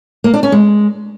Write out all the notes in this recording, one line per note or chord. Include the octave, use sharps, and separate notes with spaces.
A#3
D4
C#4
G#3